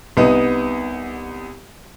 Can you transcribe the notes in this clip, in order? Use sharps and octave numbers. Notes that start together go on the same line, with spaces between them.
C2 B3 D#4